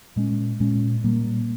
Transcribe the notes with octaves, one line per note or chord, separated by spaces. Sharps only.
A#2 G#3 C#4
A#2 G#3 C#4
A#2 G3 A#3